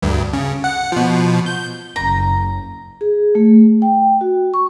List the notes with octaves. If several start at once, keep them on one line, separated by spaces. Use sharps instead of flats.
D2 G2
C#3
F#5
B2 F3
G6
F#1 A#5
G#4
A3
G5
F#4
C#6